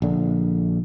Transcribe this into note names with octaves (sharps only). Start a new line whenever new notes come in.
A#1 D3